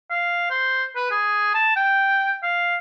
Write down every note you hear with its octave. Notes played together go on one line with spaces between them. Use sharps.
F5
C5
B4
G#4
A5
G5
F5